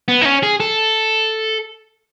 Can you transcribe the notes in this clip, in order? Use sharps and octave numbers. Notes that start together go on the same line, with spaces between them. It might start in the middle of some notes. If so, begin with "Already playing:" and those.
B3
D#4
C#4
G#4
A4